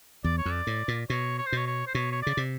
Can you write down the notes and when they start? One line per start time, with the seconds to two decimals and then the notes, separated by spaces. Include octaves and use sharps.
0.24 E2 D5
0.38 C#5
0.45 F2
0.51 D5
0.67 A2
0.88 A#2
1.10 B2 C#5
1.38 C#5
1.46 C5
1.52 B2 C#5
1.67 C#5
1.87 C5
1.95 B2 C#5
2.12 C#5
2.22 C#3 D5
2.37 C3